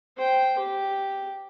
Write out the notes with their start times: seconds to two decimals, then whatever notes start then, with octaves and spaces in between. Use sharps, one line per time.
0.17 C5 G5
0.58 G4